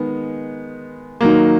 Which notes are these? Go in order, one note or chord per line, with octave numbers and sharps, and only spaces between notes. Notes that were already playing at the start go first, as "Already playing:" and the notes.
Already playing: D#3 G#3 B3
D#3 F#3 A#3